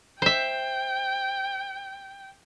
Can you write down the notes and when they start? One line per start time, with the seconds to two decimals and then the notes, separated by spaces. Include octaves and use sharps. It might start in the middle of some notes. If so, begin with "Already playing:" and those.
0.22 C5 E5 G5